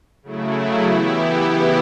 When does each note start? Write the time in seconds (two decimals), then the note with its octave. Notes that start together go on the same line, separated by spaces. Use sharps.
0.23 C#3 F#3 A3 E4
0.86 E3 B3 E4 G4
1.49 C#3 E3 B3 E4 G4